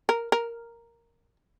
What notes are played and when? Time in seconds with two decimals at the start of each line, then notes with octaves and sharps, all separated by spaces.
0.09 A#4
0.32 A#4